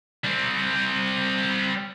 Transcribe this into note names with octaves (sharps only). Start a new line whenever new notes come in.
G3 C4